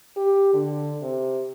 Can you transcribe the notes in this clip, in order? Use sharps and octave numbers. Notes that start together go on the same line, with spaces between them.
G4
D3
C3